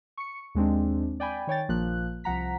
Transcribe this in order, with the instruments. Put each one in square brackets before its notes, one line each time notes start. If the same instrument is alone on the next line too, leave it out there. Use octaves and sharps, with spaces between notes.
[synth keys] C#6 C#7
D#2 G#3 C4 D4
D5 G5 G#5 B5
D#3 C#5 G5 A6
A#1 F3 A#3 F#6
C2 F3 F#5 A#5 B6